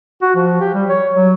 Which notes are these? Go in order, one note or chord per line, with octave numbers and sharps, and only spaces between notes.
F#4
F3
G4
G3
C#5
F#3